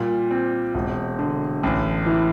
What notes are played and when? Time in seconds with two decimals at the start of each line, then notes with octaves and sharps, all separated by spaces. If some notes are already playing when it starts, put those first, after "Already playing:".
Already playing: A#2 G3
0.31 C4
0.74 E1
1.19 D3
1.63 A1
2.06 E3